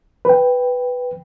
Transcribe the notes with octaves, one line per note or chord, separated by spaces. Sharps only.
B4 G5